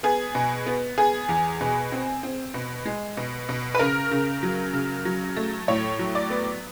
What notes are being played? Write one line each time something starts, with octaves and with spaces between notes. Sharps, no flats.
B3 G#4
B2
B3
B3 G#4
E2
B2
C4
C4
B2
G#3
B2
B2
B4
C#3 A#4
C#3
F#3
C#3
F#3
A3
A2 C#5
F#3
D5
B3